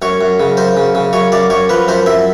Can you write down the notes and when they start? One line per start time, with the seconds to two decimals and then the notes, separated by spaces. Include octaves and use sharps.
0.02 F#2 C#5
0.21 F#2
0.40 C#3
0.57 F#2 C5
0.77 C#3
0.95 C#3
1.13 F#2 C#5
1.32 F#2 D5
1.50 F#2 C#5
1.69 F3 B4
1.88 F#2 C5
2.06 F#2 E5